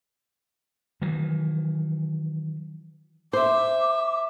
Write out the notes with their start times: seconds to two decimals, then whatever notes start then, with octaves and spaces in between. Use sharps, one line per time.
1.02 D#3 E3 F#3
3.33 C5 E5 D6